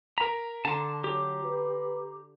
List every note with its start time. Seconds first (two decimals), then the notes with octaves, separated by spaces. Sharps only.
0.18 A#4 A#5 B6
0.65 D3 A5 A#5 C6
1.04 F#3 G4
1.44 B4